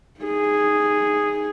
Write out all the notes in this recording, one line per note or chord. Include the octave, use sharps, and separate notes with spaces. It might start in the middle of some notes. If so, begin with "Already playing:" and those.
D#4 G#4